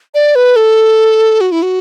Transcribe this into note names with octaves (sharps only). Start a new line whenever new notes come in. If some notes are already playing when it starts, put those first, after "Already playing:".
D5
B4
A4
F#4
E4
F#4